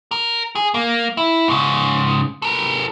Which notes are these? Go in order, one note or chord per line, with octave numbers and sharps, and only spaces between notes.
A#4
G#4
A#3
E4
G#2 C#3
A4 A#4